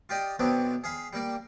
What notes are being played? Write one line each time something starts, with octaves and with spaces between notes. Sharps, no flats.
F4 G4 D5 D#5
B1 B3 C4 D4 D6
G#4 F5 B5
G3 A#3 D5